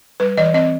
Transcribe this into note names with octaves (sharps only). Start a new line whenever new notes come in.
G3 B4
E3 D#5
C4 D#5